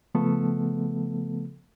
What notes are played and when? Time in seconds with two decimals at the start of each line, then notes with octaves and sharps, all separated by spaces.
0.15 C#3 F3 A3 B3 A4